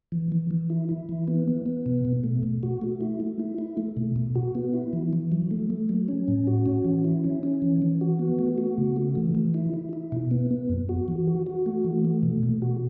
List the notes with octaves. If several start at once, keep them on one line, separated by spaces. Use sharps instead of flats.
E3
E3
E3
E4
E4
E3
B3
B3
B3
B2
B2
A3
B2
F#4
A3
E4
A3
E4
E4
A3
B2
B2
F#4
B3
E4
E3
E3
F#3
A3
A3
F#3
C#4
A2
F#4
C#4
E3
E4
C#4
C#4
E3
E3
F#4
B3
A3
F#4
C#3
A3
E3
E3
E4
E4
E4
B2
B3
B3
F#2
F#4
E3
F#4
F#4
A3
E3
A3
B2
B2
F#4